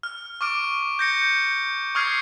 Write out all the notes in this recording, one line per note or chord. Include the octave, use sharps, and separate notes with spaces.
F6
C#6 D6 F6 D7
G6 A#6 C#7
C#6 D#6 F6 G#6 C7